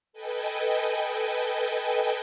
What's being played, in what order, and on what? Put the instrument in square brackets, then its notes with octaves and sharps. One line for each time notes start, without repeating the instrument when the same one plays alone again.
[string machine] A4 B4 D#5 G5 G#5